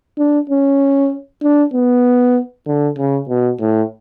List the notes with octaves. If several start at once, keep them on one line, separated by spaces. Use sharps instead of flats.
D4
C#4
D4
B3
D3
C#3
B2
A2